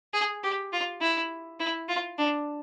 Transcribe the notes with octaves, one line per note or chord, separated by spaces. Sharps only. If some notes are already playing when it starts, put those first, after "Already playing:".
G#4
G4
F4
E4
E4
F4
D4